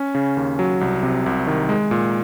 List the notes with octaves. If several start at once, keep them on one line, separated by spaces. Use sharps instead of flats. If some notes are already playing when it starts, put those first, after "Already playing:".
Already playing: C#4
C#3
D#2
F#3
C2
C3
C2
D#3
G#3
A#2